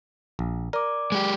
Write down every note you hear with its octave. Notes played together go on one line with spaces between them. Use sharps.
A#1
A#4 D5 D6
G#3 G4